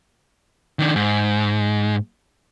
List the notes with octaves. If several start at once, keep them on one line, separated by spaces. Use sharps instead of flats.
D#3 D4
G#2